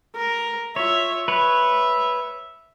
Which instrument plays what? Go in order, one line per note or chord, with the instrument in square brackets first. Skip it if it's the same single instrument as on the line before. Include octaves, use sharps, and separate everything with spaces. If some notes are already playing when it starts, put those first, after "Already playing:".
[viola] A#4
[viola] F4 E5 [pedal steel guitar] C#5
[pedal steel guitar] B4 C#5 [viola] E5